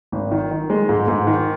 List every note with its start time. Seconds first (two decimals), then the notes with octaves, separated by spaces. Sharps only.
0.12 G#1
0.31 D#3
0.51 D#3
0.70 G#3
0.89 G#2
1.08 G#2
1.27 D#3